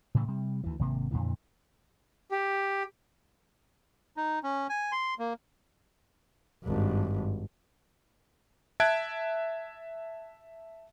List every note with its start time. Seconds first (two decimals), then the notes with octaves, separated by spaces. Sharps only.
0.15 A2 C#3 E3 A3
0.28 C3 G3
0.64 D2 E3
0.79 G#1 C3 A#3
1.11 F2 A#2 D3 E3
2.32 G4
4.17 D#4
4.43 C#4
4.70 G#5
4.92 C6
5.19 A#3
6.63 G#1 G2
8.80 E5 A5 F#6 G#6 D7